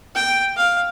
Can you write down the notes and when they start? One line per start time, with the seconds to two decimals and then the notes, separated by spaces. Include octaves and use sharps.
0.15 G5
0.56 F5